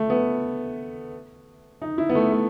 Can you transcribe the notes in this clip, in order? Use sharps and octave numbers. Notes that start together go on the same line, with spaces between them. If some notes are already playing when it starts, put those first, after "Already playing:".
Already playing: A3
B3
D#4
E4
B3
A3
A3